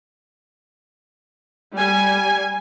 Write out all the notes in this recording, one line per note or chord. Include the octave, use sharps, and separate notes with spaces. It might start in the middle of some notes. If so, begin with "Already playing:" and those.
G3 G#5